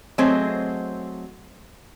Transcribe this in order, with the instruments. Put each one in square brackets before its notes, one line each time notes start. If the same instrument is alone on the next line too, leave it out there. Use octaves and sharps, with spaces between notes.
[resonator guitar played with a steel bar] F#3 A3 C4 G#4 C5 D#5